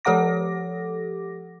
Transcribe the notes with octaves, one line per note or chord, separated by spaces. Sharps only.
F3 G4 A4 F#5 D6 A#6